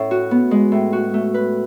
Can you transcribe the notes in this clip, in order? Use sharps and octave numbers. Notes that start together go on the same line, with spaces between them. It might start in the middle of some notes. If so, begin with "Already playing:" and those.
Already playing: A2 A3 C#4 C#5
F#4
B3
G#3
A2
F#4
A3
B4